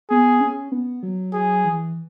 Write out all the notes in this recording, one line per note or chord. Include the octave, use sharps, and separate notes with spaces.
B3 G#4
C#4
B3
F#3
F#3 G#4
E3